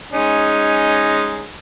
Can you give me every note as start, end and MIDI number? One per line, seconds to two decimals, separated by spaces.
0.13 1.48 56
0.13 1.48 61
0.13 1.48 63